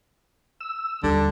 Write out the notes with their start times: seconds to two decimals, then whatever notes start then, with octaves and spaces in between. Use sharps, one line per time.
0.61 E6
1.03 D#2 D3 G3